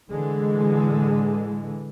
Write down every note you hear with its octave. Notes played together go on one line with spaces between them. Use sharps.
A2 D3 E3 G#3